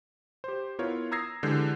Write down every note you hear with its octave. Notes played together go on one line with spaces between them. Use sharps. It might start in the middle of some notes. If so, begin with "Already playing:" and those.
G4 C5
B3 E4 F4 A#4 C#5
A#5 D#6 E6 G#6 A#6 C7
D3 E3 G#3 G4 G6 C7